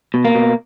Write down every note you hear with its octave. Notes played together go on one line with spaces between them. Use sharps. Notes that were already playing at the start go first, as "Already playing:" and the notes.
B2
A#3
B2